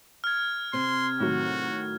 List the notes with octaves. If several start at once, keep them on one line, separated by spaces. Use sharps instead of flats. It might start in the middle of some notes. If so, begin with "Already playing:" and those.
F6 G#6
C3 C4 C6
A2 D#3 F#3 F#4